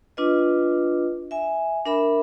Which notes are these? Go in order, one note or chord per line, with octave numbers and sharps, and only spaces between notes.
D4 F4 B4 D#5
E5 G#5
D4 A#4 E5 B5